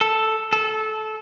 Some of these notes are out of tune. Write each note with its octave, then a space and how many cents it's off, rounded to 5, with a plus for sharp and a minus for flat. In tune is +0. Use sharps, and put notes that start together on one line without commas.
A4 +0
A4 -20